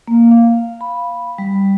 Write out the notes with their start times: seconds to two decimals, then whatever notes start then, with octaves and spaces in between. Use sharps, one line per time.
0.08 A#3
0.31 F5
0.81 B5
1.38 G3